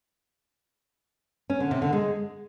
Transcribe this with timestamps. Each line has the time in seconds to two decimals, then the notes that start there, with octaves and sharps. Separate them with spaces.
1.50 C#4
1.60 D3
1.71 C3
1.82 D3
1.93 G#3